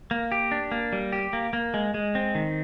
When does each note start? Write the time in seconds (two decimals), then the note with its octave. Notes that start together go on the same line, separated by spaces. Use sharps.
0.11 A#3
0.32 G4
0.51 D4
0.71 A#3
0.93 G3
1.12 G4
1.33 A#3
1.53 A#3
1.74 G#3
1.94 G#3
2.15 C4
2.35 D#3